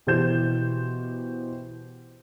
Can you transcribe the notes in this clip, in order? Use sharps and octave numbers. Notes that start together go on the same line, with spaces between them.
B2 E3 G4 C5 G6 E7